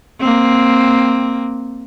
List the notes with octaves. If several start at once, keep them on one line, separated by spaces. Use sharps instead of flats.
A#3 C4